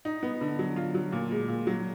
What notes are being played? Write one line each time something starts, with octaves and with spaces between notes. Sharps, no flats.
D#4
B3
D3
F#3
F4
F#3
A#2
G#3
A#2
F#3